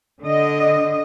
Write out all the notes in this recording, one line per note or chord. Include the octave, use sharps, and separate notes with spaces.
D3 D#5